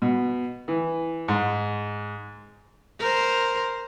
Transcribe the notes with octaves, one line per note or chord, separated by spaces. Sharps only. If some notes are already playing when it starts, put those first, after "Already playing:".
B2
E3
G#2
A#4 C5